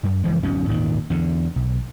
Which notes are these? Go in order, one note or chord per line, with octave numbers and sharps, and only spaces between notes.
F#2
F#1 E3 F3 G#3
D1 B1 F#2 C#4
G#1 D#2 A#2 D#3
E2 D3
B1